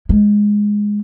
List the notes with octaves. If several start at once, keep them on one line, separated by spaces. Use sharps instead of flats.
G#3